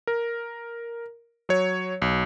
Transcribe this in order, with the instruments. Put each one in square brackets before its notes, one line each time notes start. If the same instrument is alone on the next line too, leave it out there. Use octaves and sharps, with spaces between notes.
[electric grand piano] A#4
F#3 C#5
B1